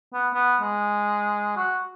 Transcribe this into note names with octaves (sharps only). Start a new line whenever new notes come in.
B3
B3
G#3
F#4